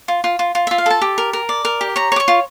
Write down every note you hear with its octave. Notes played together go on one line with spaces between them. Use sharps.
F4
F4
F4
F4
F4 E5
F5
A4 A5
G4
A#4
A#4
D5
A#4
G4
C#5 A#5
C#5 D6
C#6
F4